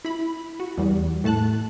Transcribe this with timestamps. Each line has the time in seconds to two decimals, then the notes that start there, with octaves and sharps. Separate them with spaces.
0.05 E4 B5
0.60 F#4
0.78 E2 G3
1.24 A2 A3 A5 F#6